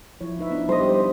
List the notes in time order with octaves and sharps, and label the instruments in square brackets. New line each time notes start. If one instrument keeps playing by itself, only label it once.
[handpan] F3 E4 C#5
D#4 B4 E5
B3 D4
[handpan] G3 [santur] C5 D#5
[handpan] G4